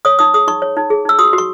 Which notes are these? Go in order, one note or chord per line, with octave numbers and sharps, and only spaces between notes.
C#5 D#6
D#4 D#6
G#4 D#6
D#4 C#6
C#5
D#4
G#4
D#4 E6
F#4 D#6
F#4
C#6